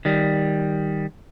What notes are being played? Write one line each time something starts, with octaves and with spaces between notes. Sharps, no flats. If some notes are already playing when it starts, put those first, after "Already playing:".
D#3 G3